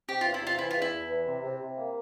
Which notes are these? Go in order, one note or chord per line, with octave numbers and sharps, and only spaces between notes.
C3 G4
E2 F4
E4
C3 F4
E3 E4
F4
E2
E4
E2
E3
C3
C3
C3
A#3